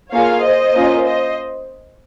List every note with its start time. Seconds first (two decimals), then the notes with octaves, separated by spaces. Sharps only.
0.12 A#3 F4 G#4 C#5 F5
0.43 C5 D#5
0.74 A#3 C#4 F4
1.05 C5 D#5